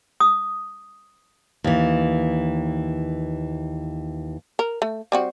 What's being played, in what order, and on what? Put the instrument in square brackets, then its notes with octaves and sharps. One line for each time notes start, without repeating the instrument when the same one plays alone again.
[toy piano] D#6
[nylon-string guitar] D#2 E3
[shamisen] A#4
A3
G3 C4 F#4